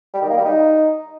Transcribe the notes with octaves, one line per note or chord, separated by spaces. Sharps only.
G3
D#3
A#3
G3
D#4